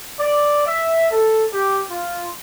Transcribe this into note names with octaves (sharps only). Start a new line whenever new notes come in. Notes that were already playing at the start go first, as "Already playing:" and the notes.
D5
E5
A4
G4
F4